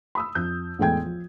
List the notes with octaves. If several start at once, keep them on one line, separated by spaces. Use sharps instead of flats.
B5 D#6 E6
F2 G6
A1 E2 G#3 A4 G5 G#6
F3